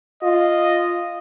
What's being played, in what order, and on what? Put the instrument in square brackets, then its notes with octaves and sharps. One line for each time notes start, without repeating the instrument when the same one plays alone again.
[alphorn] F4 [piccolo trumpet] D#5